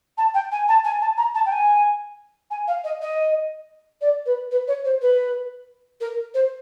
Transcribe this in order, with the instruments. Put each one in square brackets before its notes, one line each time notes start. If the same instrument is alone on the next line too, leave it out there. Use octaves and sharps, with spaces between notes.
[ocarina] A5
G5
G#5
A5
G#5
A5
A#5
A5
G5
G#5
G#5
F5
D#5
D#5
D5
B4
B4
C#5
C5
B4
A#4
C5